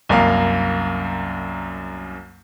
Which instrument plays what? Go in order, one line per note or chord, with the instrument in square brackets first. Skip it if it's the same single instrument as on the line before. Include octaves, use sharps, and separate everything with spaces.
[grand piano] C2 F#2 A#3 F5